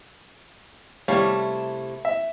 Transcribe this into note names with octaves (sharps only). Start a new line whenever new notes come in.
C3 G3 A3 E4 C#5 F5
E5